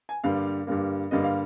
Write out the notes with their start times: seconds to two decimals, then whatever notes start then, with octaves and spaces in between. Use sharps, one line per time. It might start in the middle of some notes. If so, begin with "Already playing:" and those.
0.09 G#5
0.24 G2 D3 G3 A#3 F5
0.67 G2 D3 G3 A#3
1.11 G2 D3 G3 A#3 D#5
1.24 F5